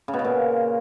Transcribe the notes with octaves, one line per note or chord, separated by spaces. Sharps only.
C#3
B2
C#3
A#2